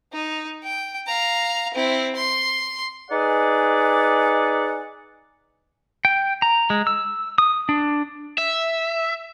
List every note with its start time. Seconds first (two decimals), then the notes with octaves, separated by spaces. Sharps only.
0.12 D#4
0.63 G5
1.07 F5 A#5
1.74 C4 E4
2.15 C6
3.10 D#4 G#4 B4 D5 F#5 G#5
6.05 G5
6.42 A#5
6.70 G#3
6.87 E6
7.38 D#6
7.69 D4
8.38 E5